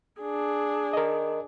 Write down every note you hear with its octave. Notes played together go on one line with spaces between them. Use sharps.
D4 G#4
A#4 D#5